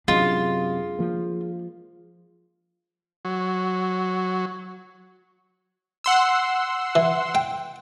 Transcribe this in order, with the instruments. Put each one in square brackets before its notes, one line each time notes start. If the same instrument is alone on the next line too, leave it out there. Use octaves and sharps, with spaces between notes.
[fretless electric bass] F#2 C3 F#3 [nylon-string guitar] G#3 [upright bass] D4 [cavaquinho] F4
[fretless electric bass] F3 A#3
[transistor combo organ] F#3
[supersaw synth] F#5 C6 E6
[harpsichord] E3
G5